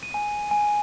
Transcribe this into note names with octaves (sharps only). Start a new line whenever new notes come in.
D#7
G#5
G#5